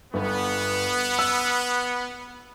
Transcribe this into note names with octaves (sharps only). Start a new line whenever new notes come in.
G1 B3
E6